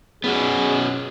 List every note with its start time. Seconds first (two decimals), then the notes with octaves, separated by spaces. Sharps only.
0.24 B3 C#4 F#4 G#4